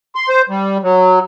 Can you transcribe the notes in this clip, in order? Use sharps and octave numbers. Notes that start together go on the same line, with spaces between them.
C6
C5
G3
F#3